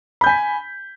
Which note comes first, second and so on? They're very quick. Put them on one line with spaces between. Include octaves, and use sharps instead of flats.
B5 G6 G#5 B6